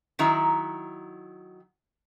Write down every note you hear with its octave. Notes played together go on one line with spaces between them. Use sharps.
D#3 F#3 E4 A#5